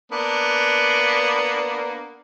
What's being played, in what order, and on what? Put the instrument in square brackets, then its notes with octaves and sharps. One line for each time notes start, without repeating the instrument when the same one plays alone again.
[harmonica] A#3 B3 D4